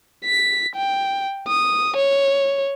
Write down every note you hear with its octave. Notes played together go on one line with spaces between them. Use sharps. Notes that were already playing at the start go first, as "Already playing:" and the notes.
B6
G5
D#6
C#5